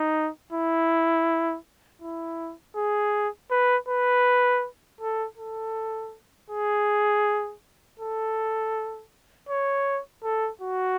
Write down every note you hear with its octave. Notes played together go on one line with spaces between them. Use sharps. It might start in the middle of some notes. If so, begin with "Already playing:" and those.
Already playing: D#4
E4
E4
G#4
B4
B4
A4
A4
G#4
A4
C#5
A4
F#4